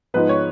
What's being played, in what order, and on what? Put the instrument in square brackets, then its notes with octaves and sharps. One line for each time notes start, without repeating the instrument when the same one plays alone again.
[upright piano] G#2 F3 G#3 B3 B4
C#5